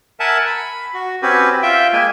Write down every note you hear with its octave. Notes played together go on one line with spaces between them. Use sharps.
A#4 E5 F#5 G#5 A5
B5
F#4
C4 C#4 F#4 G4 B4
F4 E5 G5
G#3 A#3 G#5